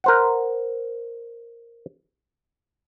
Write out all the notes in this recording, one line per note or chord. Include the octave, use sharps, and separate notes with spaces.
A#4 C5 F#5